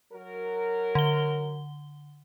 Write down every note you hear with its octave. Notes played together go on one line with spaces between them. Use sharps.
F#3 A#4
D3 G7